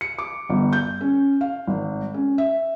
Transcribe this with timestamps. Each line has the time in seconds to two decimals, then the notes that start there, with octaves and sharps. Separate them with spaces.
0.01 C#7
0.19 D6
0.49 G1
0.73 G6
1.01 C#4
1.41 F5
1.67 G#1
2.14 C#4
2.38 E5